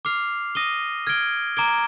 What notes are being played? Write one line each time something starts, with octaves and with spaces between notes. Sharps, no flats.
D6 F6 C7 F7
D#6 A#6 D#7 G7
F6 G#6 D7 G7
A#5 D6 G#6 D7 G7